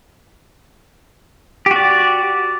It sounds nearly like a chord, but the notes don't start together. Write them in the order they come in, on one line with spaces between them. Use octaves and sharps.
G4 F#4 D5